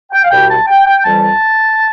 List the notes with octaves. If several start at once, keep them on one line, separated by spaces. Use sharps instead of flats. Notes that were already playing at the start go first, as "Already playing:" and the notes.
G5
F5
C2 B2 G3 G5
A5
G5
G5
F2 E3 G3 A5